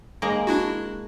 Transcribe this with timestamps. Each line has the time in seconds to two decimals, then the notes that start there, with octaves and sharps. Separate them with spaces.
0.22 G#3 A#3
0.47 D4 E4 F#4